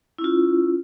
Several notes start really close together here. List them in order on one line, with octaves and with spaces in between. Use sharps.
E4 C#4 F4